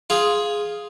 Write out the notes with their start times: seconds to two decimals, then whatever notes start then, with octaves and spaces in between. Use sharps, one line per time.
0.10 F4 G#4